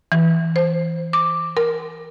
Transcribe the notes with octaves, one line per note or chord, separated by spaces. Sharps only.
E3
C5
D6
A#4